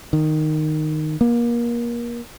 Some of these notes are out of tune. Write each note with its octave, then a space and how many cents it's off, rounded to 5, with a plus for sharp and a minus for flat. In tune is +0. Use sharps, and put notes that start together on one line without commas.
D#3 -10
A#3 +30